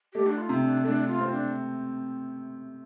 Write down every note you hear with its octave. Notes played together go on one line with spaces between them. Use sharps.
A3 G4
D4
F4
C3
D4
A3 D4
F4
C4
D4